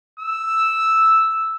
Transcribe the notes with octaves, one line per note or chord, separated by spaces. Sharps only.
E6